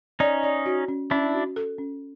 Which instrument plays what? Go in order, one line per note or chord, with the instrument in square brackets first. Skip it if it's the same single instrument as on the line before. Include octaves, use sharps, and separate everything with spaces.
[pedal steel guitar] C#4 D#4 [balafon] D5
[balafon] D5
F#4
C#4
[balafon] C#4 [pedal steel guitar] D4 E4
[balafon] F#4
A4
C#4